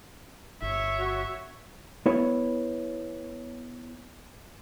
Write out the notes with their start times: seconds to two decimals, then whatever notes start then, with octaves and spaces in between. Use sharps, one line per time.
0.62 G1 C#5 E5
0.99 F#4
2.06 B3 E4 C#5